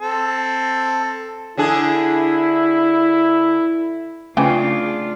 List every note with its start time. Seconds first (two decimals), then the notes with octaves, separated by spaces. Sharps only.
0.01 C4 A4
1.57 D3 D4 E4 G#4
4.37 C#3 E3 A3 C4 D4 F4 G5